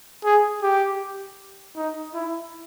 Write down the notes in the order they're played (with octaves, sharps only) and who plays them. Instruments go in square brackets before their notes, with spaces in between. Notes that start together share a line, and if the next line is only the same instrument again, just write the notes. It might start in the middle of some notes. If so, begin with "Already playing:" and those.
[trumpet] G#4
G4
D#4
E4